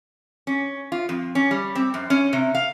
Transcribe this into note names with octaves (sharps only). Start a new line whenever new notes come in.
C#4
F4
F2
C#4
G3
C4
F#2
C#4
C3
F5